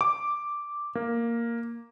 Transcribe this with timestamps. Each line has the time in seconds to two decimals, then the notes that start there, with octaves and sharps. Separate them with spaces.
0.01 D6
0.95 A#3